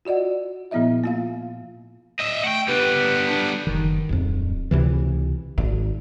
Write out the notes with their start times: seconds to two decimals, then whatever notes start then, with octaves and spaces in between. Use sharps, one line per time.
0.05 F4 F#4 D5 D#5 F#5
0.71 A#2 F3 B3 E4 D#5 E5
1.04 A#3 F4 F5
2.19 D#5 E5
2.44 A3 F#5 G5
2.68 G3 B3 B4
3.29 D4
3.67 F#1 D#3
4.09 D1 F2
4.71 C#2 C3 E3
5.58 G#1